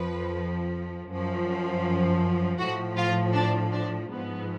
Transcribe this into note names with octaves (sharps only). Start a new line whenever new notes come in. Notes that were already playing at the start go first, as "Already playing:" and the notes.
Already playing: F2 F3 B4
F#2 F3
A2 F3 F#4
F4
D4
D4
G#2 F3 B3